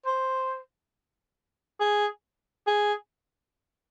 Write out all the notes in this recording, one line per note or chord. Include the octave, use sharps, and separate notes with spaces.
C5
G#4
G#4